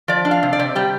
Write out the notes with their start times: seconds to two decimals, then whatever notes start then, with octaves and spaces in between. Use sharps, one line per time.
0.08 F3 D5
0.25 D4
0.31 F5
0.43 C3
0.53 D5
0.59 C3
0.75 G3 G4